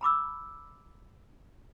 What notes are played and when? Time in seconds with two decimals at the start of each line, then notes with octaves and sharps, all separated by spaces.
0.01 A#5 B5 D6 E6